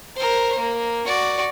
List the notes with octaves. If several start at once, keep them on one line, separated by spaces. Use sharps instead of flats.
A#4 C5
A#3
F#4 D5